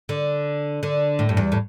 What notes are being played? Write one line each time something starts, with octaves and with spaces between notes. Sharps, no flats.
D3
D3
A2
G2
E2
A2